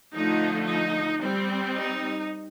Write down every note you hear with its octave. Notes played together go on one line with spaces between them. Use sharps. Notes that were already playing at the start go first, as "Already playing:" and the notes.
D3 F3 A3 D#4
D#4
G3 C4
D#4